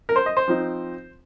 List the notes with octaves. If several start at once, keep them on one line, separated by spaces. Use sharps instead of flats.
A#4
C5
D#5
C5
F3 C4 D#4